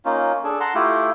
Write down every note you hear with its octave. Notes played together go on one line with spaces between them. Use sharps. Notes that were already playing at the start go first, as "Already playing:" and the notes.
A#3 C#4 D#4 F4
D4 G#4 A4
F#5 A5 A#5 C6
A3 E4 F4 G4